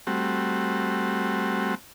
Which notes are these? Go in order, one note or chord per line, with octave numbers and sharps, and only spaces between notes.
G3 A3 C4 F#4